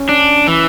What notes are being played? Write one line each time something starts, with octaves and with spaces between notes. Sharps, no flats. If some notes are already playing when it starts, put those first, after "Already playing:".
Already playing: C#4
D4
E3